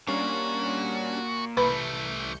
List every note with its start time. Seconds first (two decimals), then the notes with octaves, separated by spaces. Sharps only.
0.08 A#2 G3 A#3 C#4 D4 F#4 F5
1.57 C2 E3 A3 B4 B5 G6 C#7